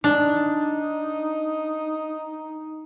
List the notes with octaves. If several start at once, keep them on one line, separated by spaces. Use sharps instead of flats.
D4 D#4